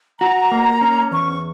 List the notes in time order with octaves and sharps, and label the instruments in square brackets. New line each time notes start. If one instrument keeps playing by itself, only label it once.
[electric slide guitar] F#4 [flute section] A#5
[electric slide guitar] A#3
C#4
[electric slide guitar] E2 [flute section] C#6